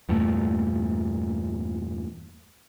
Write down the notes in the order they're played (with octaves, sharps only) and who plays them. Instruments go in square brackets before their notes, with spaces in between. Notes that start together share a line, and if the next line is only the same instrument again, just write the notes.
[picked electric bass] E2 G2 A#2 A3